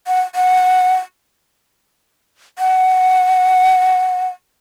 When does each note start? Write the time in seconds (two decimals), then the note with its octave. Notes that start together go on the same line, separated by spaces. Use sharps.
0.07 F#5
0.35 F#5
2.59 F#5